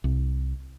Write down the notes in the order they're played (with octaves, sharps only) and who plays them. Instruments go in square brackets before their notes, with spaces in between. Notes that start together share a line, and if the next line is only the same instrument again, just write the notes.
[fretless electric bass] C2